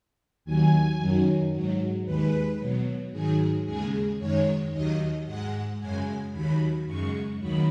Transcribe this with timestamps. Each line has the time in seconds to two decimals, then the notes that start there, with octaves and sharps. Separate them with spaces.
0.45 D#2 D#3 F#3 G#5
0.98 F#2 D#3 F#3
1.52 G#2 F#3
2.05 D#2 D#3 G#3 B4
2.58 B2 F#3
3.12 G#2 D#3 F#3 G#4
3.65 D#2 C#3 G#3 G#4
4.19 F#2 D#3 G#3 C#5
4.72 D#2 D#3 F#3 D#5
5.26 G#2 G#3 F#5
5.79 F#2 C#3 G#3 G#5
6.32 D#2 D#3 F#3 B5
6.86 F#2 C#3 G#3 C#6
7.39 D#2 D#3 F#3 B5